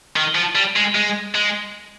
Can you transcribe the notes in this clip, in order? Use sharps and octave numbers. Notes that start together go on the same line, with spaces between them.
D#3
F3
G3
G#3
G#3
G#3